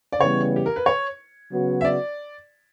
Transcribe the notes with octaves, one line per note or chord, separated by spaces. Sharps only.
D5
C#3 E3 G3 B3 C#5
G4
A#4
B4
C#5
C#3 F#3 B3 F#4
E5
D5